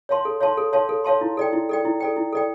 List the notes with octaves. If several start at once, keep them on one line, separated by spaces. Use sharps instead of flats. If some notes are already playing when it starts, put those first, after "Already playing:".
C#5 F5 A5 C6
A4
C#5 F5 A5 C6
A4
C#5 F5 A5 C6
A4
C#5 F5 A5 C6
E4
A4 D5 G5
E4
A4 D5 G5
E4
A4 D5 G5
E4
A4 D5 G5